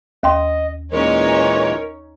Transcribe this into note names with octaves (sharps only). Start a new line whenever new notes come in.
D#2 D#5 G5 C6
A#2 E3 G#3 C#4 D#4 A#4 C#5